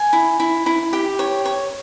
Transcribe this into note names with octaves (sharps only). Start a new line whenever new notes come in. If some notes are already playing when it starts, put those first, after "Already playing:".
Already playing: G#5
E4
E4
E4
G4
C#5
C#5